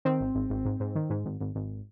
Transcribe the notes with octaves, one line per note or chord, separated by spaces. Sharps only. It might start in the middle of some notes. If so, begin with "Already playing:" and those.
D#3 C4
G#1
G#1
G#1
G#2
G#2
D#3
G#2
G#1
G#1
G#1